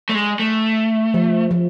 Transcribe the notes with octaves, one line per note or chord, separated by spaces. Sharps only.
A3
G#3
A3
F3
F3